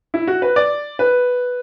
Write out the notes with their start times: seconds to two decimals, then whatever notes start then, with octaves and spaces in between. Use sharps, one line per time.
0.14 E4
0.27 F#4
0.42 B4
0.56 D5
0.99 B4